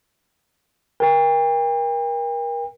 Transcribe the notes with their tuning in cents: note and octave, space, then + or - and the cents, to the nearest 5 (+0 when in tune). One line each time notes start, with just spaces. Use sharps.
A#4 +30 G5 +40